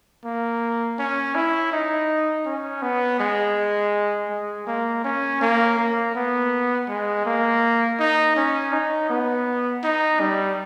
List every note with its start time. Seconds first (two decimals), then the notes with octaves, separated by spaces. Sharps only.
0.25 A#3
0.99 C#4
1.35 E4
1.72 D#4
2.46 C#4
2.82 B3
3.20 G#3
4.30 G#3
4.67 A#3
5.04 C#4
5.41 A#3
5.78 A#3
6.15 B3
6.88 G#3
7.26 A#3
7.99 D#4
8.36 C#4
8.73 D#4
9.10 B3
9.84 D#4
10.20 G3